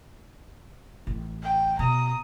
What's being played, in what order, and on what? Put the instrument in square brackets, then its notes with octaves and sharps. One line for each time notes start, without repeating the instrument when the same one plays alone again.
[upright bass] A1
[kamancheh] G5
[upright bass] B2 [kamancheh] A#5 D#6